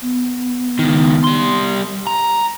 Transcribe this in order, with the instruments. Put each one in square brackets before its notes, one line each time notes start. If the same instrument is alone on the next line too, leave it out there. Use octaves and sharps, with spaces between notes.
[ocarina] B3
[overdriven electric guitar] C#2 D#3
G3 C6
A#5